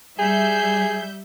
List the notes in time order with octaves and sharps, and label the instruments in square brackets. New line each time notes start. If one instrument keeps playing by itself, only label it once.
[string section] G3 E5 G6 [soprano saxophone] G#4